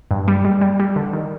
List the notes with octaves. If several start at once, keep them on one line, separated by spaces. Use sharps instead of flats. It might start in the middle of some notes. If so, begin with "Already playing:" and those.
G2
G3
G3
G3
G3
D3
D#3